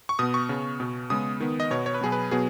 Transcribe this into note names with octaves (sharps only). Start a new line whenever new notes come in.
C#6
B2 B3 D#6
C#6
C#3 B3
B2 B3
C#3 G#3 B3 D#6
D#3 B3
D#5
B2 B3 C#5
C#5
B4
B2 F#3 B3 G#4
B4
B2 F#3 B3 G#4